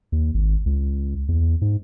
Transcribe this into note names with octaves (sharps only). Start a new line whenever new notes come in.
D#2
G#1
C#2
E2
G#2